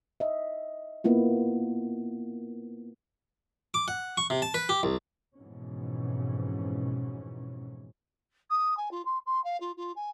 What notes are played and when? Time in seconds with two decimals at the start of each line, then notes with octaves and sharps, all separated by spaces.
0.20 D#5 E5
1.04 A#3 B3 E4 F4
3.74 D6
3.88 F#5
4.17 C#6
4.30 C3
4.42 A5
4.54 B4
4.69 G4
4.83 C2
5.37 F2 G#2 B2 E3 C#4
8.50 D#6
8.77 G#5
8.91 F4
9.05 C6
9.26 C6
9.44 F5
9.60 F4
9.77 F4
9.96 G#5